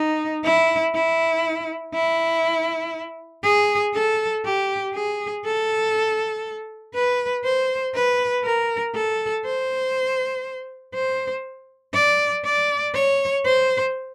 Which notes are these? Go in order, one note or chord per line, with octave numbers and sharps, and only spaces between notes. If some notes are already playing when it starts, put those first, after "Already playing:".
Already playing: D#4
E4
E4
E4
G#4
A4
G4
G#4
A4
B4
C5
B4
A#4
A4
C5
C5
D5
D5
C#5
C5